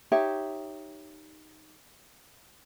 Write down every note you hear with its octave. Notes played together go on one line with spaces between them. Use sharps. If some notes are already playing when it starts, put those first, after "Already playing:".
D#4 G4 C#5 E5